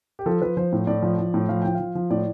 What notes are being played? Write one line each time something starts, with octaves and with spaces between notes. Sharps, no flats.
G4
F3 A4
F3 B4
F3 C5
A2
A2 D5
F3
F3
A2
F3 F5
F3 G5
F3 F5
F3
A2 D5